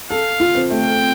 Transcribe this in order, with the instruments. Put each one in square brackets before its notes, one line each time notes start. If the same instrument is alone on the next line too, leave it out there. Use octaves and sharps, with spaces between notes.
[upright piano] A4 [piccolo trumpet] F5
[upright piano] F4
C4
[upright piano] A3 [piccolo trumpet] G5